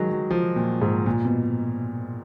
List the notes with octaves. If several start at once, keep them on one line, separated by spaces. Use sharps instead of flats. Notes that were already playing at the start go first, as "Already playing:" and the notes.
Already playing: D#3 F#3 G#3
F#3
F3
A#2
G#2
A#2
B2